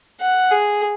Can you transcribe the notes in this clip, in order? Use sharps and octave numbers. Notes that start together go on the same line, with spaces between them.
F#5
G#4